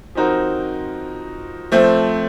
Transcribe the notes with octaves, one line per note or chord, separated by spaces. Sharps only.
F3 C4 D#4 F#4 A#4
F3 A3 C4